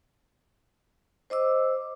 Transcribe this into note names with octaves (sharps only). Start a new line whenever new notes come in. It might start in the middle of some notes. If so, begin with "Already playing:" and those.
C5 D#5 D6 E6